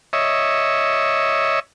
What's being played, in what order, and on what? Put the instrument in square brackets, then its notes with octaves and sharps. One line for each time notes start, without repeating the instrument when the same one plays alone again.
[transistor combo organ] C#5 D#5 E5